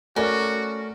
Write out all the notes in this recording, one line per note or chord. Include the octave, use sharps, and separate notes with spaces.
A3 C#4 F#4 A#4 D5